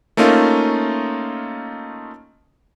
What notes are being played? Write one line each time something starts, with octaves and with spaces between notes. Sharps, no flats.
A3 A#3 C#4 D#4 F4